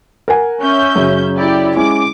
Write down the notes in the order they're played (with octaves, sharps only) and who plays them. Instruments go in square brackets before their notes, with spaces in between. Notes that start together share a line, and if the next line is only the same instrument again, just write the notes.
[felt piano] A#4 F#5 G#5
[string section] C#4 E5 G6
[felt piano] F#2 C#3
[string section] E4 G4 D5
[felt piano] G#3 C#4 E4 [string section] D6